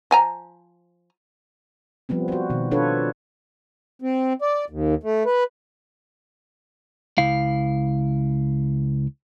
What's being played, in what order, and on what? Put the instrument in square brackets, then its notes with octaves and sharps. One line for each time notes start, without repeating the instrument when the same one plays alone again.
[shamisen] F3 G#5 A#5
[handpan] F3 G3 B3 C4
F#4 C5
B2 D#3
D4 F4 A4 B4 C#5
[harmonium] C4
D5
D#2
A3
B4
[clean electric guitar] C#2 E4 F5